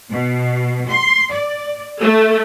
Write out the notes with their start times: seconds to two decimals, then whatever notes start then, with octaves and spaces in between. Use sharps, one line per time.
0.11 B2
0.89 C6
1.32 D5
2.00 A3